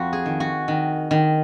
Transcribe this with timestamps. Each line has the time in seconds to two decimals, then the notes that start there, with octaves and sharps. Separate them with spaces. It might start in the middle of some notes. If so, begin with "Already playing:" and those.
Already playing: F2 F#4
0.13 G#4
0.26 D#3
0.40 F#4
0.68 D#3
1.11 D#3